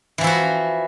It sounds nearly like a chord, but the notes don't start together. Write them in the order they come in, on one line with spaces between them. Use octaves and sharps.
E3 F3 E4 F#4